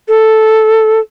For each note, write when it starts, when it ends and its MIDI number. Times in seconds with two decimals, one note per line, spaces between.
0.08 0.99 69